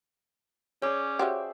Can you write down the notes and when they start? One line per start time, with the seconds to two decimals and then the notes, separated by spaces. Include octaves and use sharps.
0.82 C#4 G#4 C#5 D5 D6
1.19 C#3 F#4 G4 C5 E5